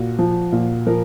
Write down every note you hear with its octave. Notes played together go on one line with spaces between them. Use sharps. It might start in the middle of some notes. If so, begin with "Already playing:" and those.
Already playing: A#2 F#4
F3
A#2
F3 A#4